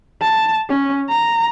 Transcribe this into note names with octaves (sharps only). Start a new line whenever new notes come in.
A5
C#4
A#5